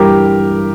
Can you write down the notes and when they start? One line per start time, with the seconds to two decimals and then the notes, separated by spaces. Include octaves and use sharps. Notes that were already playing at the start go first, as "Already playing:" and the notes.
Already playing: G2 E3 G3 G4 A#4